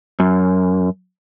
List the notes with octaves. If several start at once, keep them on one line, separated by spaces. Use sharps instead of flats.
F#2